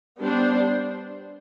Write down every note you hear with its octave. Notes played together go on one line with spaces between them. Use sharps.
G3 B3 D4 C5